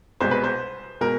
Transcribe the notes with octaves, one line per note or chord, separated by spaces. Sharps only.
C2 B2 G#3 C5
B4
C5
B2 G#3 A#4